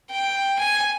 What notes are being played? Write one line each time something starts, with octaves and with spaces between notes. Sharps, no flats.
G5
G#5